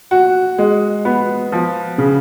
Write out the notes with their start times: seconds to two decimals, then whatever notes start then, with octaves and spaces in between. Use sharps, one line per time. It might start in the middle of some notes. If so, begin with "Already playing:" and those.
0.11 F#4
0.58 G#3
1.05 B3
1.52 F3
1.98 C#3